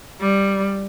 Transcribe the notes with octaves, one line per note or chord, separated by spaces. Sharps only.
G3